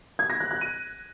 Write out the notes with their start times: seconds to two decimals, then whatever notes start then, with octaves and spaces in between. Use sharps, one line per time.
0.19 G#6
0.30 A#6
0.40 F#6
0.51 F#6
0.61 D#7